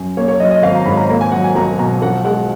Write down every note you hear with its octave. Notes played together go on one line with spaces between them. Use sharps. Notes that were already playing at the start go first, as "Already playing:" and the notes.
Already playing: F#2
A#3 C#5
C#5
F#3 D#5
D#5
G#1 F5
A#5
G#2 B5
A#5
A#3 A#5
G#5
F#3 F#5
G#5
B1 A#5
B2 A#5
A#1 F#5
G#3 F#5